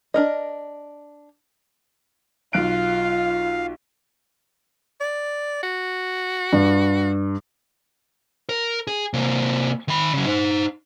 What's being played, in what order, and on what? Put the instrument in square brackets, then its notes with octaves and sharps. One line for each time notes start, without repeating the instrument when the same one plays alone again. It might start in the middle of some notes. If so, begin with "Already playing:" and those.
[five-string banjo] D4 A#4 D#5
[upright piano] B1 F#6 D7 [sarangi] F4 [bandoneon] F5
[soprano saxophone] D5
F#4
[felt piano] G2
[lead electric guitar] A#4
G#4
C3 A#3
D#3 B5
C#3 F#3
D#4 C5